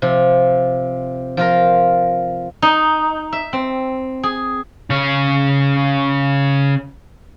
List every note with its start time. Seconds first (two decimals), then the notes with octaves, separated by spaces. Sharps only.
0.02 C3 F3
1.37 F3 F4 A#4
2.62 D#4
3.32 E5
3.53 C4
4.23 G#4
4.90 C#3 C#5